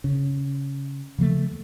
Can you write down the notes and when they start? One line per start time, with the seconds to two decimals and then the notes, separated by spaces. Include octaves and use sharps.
0.04 C#3
1.18 C#3 F3 G3 A3